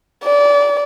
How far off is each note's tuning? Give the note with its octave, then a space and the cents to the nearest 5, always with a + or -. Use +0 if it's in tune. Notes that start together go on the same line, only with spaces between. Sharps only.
D5 -25